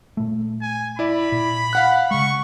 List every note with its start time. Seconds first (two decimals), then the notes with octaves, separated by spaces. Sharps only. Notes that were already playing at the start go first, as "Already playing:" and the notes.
0.17 A#2 A3
0.62 G#5
0.99 E4 D5 B5
1.32 A#2
1.73 F5 F#5 F#6
2.11 C#3 G#3 C#6